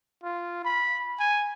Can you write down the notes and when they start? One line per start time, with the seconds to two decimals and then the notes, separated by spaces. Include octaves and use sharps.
0.23 F4
0.64 B5
1.20 G#5